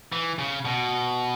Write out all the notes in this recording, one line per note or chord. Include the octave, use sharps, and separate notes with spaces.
E3
C#3
B2